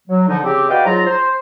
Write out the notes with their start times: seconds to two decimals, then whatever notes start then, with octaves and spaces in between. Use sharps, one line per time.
0.08 F#3
0.28 D3 F3 D#4
0.43 C#3 C4 G4
0.68 F#4 B4 D5 D#5 F5 G5
0.85 G#2 F#3 F4 A#5
1.06 C5